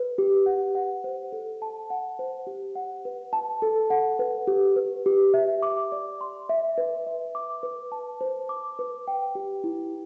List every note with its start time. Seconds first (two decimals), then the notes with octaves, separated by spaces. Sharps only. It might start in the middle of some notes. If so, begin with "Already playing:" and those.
Already playing: B4
0.18 G4
0.46 F#5
0.75 F#5
1.04 C5
1.32 A4
1.62 A5
1.90 F#5
2.19 C5
2.47 G4
2.75 F#5
3.05 B4
3.33 A5
3.62 A4
3.90 F#5
4.19 B4
4.47 G4
4.76 B4
5.06 G4
5.34 E5
5.63 D6
5.92 D5
6.21 C6
6.49 E5
6.78 B4
7.07 E5
7.35 D6
7.63 B4
7.92 A5
8.21 C5
8.49 D6
8.79 B4
9.08 G5
9.35 G4
9.64 E4